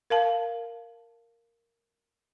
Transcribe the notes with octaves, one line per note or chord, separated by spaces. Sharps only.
A#4 F5 A5